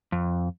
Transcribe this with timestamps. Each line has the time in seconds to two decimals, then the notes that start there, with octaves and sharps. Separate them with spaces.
0.12 F2